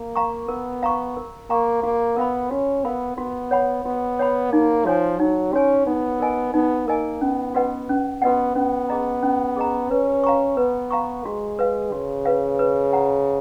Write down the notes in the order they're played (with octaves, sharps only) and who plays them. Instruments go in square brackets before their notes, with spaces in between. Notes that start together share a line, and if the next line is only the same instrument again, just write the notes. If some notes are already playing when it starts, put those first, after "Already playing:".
Already playing: [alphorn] A#3
[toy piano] F5 A#5 C#6
[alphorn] B3 [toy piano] A#4
[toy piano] F5 A#5 C#6
A#4
[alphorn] A#3 [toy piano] F5 A#5 C#6
[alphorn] A#3 [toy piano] F#4
[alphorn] B3 [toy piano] A#4 F5 B5
[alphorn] C#4 [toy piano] F#4
[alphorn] B3 [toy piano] A#4 F5 B5
[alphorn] B3 [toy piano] F#4
[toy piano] C#5 F#5 B5
[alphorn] B3 [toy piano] F#4
[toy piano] C#5 F#5 B5
[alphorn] A#3 [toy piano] D#4
[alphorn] F3 [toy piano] F#4 C#5 G#5
[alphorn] F#3 [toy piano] D#4
[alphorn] C#4 [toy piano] F#4 C#5 G#5
[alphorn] B3 [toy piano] D#4
[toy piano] A#4 D#5 G#5
[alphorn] B3 [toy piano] D#4
[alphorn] A#3 [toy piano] A#4 D#5 G#5
[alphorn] B3 [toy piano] C#4
[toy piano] F#4 B4 D#5 F#5
C#4
[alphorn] B3 [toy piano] F#4 B4 D#5 F#5
[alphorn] B3 [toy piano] C#4
[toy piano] G#4 D#5 A#5
C#4
G#4 D#5 A#5
[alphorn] C#4 [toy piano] B4
[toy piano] F5 A#5 C#6
[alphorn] B3 [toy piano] B4
[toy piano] F5 A#5 C#6
[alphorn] G#3 [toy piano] F#4
[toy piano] B4 F5
[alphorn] C#3 [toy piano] F#4
[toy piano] B4 F5
B4
F#5 A#5